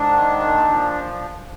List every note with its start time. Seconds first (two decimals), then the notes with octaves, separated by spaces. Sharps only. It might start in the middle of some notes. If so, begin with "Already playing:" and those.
Already playing: G#2 D4
0.13 D#3
0.40 A#2
0.67 F3